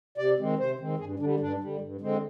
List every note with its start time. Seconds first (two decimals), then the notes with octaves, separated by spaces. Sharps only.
0.18 C3 D5
0.39 D#3 G#3 C4
0.58 C3 C5
0.79 D#3 G#3 C4
0.99 G2 G#4
1.19 D3 G3 D4
1.40 G2 D4
1.61 D3 G3
1.81 G2
2.01 D3 G#3 C4